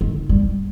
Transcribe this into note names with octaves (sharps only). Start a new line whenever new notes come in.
D#3
G3